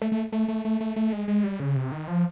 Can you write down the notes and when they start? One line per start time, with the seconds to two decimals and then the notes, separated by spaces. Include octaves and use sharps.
0.02 A3
0.12 A3
0.32 A3
0.48 A3
0.65 A3
0.81 A3
0.96 A3
1.13 G#3
1.28 G#3
1.44 G3
1.60 C#3
1.76 C3
1.92 D#3
2.08 F3